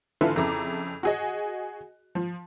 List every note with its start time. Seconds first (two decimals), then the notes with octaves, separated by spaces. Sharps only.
0.21 D3 E3 E4 F4 A4 B4
0.36 F2 C#3 E4 A4 A#5 D6
1.03 F#4 G#4 D#5
2.15 F3